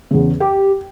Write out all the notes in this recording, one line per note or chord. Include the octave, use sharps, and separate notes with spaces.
E2 C#3
G4 G5